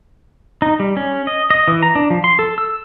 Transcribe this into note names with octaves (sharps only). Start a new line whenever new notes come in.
D#4
G3
C#4
D#5
D#5
E3
A#5
D4
F3
C6
A4
E6